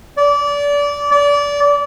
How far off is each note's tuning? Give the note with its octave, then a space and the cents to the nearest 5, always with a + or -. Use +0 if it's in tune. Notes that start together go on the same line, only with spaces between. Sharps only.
D5 -25
D5 -25